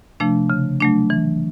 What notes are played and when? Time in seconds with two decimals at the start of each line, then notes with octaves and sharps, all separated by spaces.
0.20 C3 F3 A3 D4
0.50 C#3
0.80 F#3 A3 D4
1.10 E3